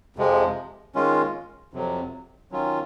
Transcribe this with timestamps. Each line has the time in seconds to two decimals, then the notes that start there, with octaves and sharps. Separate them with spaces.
0.16 F2 C3 F3 G#3
0.95 D#3 G#3 C#4 F4
1.73 F2 C3 F#3
2.52 D#3 F#3 C#4 F4